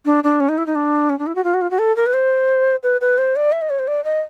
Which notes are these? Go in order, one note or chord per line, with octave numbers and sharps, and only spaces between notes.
D4
D4
C#4
D#4
E4
D#4
D4
C#4
D4
E4
F#4
F4
F#4
F4
F#4
A4
A#4
B4
C5
B4
B4
C5
D5
E5
D#5
C#5
C5
D5
D#5